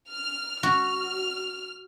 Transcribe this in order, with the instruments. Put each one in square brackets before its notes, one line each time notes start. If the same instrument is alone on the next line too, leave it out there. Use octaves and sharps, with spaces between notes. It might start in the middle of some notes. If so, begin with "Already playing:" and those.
[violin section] F6
[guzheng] F#4 [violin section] F6